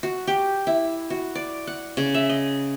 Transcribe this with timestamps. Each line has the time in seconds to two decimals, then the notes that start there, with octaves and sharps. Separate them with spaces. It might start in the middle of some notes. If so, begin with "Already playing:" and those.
0.03 F#4
0.27 G4
0.67 E4
1.10 F#4
1.35 D5
1.67 F#5
1.97 C#3
2.14 E5
2.29 D#5